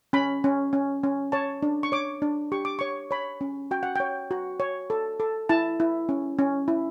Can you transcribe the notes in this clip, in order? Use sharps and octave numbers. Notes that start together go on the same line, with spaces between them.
C#4 B5
C#4
C#4
C#4
C#5 A5
D4
C#6
C#5 D6
D4
G4 C#6
D6
C#5 C#6
C#5 B5
C#4
F#4 G5
F#5
C#5 G5
F#4
C#5
A4
A4
E4 A5
E4
C#4
C#4
E4